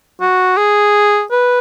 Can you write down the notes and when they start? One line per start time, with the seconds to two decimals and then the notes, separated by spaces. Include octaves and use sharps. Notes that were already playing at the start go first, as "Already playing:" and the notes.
0.21 F#4
0.57 G#4
1.31 B4